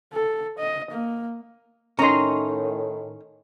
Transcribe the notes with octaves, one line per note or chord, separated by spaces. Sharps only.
A4
D#5
A#3
A2 D#3 C#4 D#4 A#5 C6